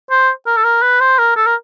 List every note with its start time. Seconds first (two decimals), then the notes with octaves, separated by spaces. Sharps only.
0.10 C5
0.47 A#4
0.57 A4
0.64 A#4
0.82 B4
1.00 C5
1.18 A#4
1.36 A4
1.46 A#4